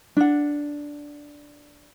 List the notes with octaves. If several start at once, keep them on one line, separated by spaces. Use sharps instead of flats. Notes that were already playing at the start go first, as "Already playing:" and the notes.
D4 F#5